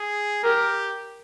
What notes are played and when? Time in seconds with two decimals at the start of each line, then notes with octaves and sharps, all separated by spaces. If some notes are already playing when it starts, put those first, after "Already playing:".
Already playing: G#4
0.44 G4 A#4